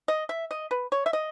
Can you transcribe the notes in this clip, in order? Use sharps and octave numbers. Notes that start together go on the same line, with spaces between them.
D#5
E5
D#5
B4
C#5
E5
D#5